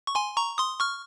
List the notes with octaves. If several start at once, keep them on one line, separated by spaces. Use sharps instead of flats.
C#6
G#5 C6
A#5 C#6
C6 D#6
C#6 F6